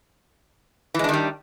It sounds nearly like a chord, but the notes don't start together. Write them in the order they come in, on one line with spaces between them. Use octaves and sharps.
E3 G#3 D4 D#3 G3